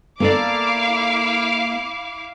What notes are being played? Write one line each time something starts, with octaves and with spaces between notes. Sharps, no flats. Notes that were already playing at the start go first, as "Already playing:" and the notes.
A#3 E4 A4 D5 F5 D6